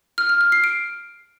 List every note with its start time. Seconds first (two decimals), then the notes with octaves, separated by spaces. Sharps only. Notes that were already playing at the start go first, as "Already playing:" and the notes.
0.18 F6
0.29 F6
0.41 F6
0.52 C7
0.64 D7